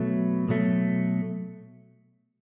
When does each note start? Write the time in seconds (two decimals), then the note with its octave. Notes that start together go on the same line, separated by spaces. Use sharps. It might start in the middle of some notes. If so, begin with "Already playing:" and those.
Already playing: B2 F#3 A3
0.49 B2 F#3 A3